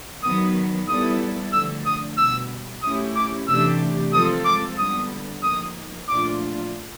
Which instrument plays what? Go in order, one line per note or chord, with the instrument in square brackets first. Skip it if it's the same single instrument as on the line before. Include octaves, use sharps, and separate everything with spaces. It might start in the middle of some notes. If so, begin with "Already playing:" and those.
[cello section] D#3 F#3 B3 [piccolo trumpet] D#6
[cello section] G3 B3 E4 A4 [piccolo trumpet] D#6
[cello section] D3 F3 A3 [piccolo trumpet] E6
[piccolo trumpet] D#6
[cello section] B2 G3 B3 [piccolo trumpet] E6
[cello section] A3 C#4 E4 G4 [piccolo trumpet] D#6
[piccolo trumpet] D6
[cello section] C3 E3 A3 D4 G4 [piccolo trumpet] E6
[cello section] F3 G#3 C4 F4 A4 [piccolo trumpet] D#6
[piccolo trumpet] D6
[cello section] D3 G3 B3 [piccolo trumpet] D#6
[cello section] F3 A#3 D#4 [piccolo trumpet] D#6
[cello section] A#2 F3 A3 D4 F4 [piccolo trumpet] D6